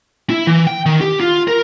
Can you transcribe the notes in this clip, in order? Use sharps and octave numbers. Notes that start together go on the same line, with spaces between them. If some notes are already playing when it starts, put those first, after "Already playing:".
E4
E3
G5
D#3
G4
F4
A#4